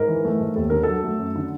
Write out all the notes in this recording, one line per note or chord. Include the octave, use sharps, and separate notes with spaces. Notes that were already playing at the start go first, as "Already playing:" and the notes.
Already playing: G#2 A#4
E3
A3
G#2
D#2 A4
D3 A#4
F#3 A4
A3
F#2
D3